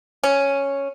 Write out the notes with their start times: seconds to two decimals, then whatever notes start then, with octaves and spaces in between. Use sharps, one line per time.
0.23 C#4